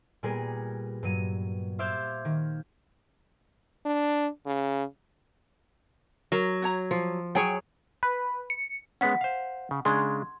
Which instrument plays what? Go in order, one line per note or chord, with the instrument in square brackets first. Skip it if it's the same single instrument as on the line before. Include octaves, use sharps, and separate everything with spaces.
[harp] A#2 G3 B3 G#4 A#4
G2 F#3 D#7
C5 E5 F5 D6 G6 G#6
D#3
[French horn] D4
C#3
[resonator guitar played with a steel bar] F#3 [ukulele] A#4
[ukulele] F#4 C#5 A#5
[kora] F3
[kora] F#3 G#4 C#5 [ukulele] G5 G#5
[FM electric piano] B4
C#7
[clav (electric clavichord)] G#3 B3 C#4 [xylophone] F#5 B6
[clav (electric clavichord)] C5 F5
C#3
[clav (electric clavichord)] C#3 G#3 D4 [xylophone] C6 G#6